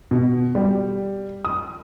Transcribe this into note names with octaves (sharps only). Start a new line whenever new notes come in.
B2
G3
D#6